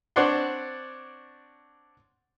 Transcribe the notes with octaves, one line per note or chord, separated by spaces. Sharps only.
C4 D4 C#5 D5 F#5 C6